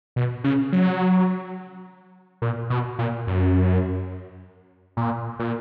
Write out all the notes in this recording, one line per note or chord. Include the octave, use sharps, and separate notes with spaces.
B2
C#3
F#3
A#2
B2
A#2
F#2
A#2
A#2